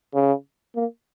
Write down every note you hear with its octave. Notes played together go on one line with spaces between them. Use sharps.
C#3
A#3